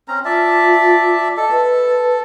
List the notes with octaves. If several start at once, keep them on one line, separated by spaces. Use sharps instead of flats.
C4 C#4 A#5
F4 D5 E5 A5
A4 D#5 A5
B4